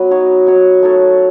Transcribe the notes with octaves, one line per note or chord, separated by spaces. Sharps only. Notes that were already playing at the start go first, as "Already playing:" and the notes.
Already playing: F#3 B3 B4
D#4 F#4 C#5
D#4 F#4 C#5
A3 D#4 A4 C#5